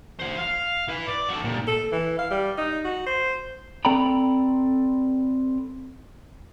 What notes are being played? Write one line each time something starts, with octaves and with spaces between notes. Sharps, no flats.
F#4 C5
F5
E4 B4
D5
F#4 A4
A#2 G3
A4
E3
F5
G3
D#4
F#4
C5
C4 A4 D5 G5 A#5 B5